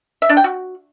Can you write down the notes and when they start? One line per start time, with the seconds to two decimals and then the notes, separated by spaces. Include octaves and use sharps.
0.22 E5
0.29 D4
0.37 G5
0.44 F#4